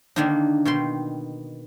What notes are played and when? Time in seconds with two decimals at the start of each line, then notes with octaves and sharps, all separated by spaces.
0.16 D3 D#3 A#3 D4 D#4
0.65 B2 D#3 G5 C6